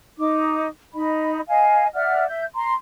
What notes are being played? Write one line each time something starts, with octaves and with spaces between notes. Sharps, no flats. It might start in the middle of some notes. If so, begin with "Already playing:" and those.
D#4 D6
D#4 D#5 B5
D#5 F5 G#5
D5 E5 F#5 F6
E5 G6
A#5 C6